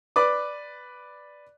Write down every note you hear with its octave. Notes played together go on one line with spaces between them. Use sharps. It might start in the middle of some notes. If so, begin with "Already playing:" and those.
B4 D5 D6